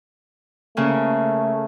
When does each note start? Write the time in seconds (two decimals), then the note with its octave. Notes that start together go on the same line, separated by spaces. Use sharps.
0.77 C#3 A3 A#3 C#4